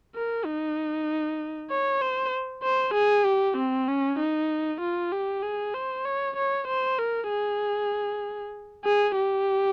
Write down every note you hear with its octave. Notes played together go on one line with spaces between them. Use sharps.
A#4
D#4
C#5
C5
C5
G#4
G4
C4
C#4
D#4
F4
G4
G#4
C5
C#5
C#5
C5
A#4
G#4
G#4
G4